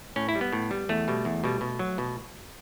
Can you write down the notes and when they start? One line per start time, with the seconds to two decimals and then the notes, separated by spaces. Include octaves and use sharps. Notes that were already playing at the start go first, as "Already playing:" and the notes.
0.16 A2 C#4
0.29 E4
0.35 G3
0.41 B3
0.53 A2
0.71 G3
0.89 E2 A3
1.08 B2 G3
1.25 E2
1.44 B2 G3
1.61 B2
1.79 F#3
1.98 B2